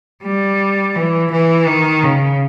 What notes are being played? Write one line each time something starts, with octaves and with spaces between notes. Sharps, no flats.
G3
E3
E3
D#3
C#3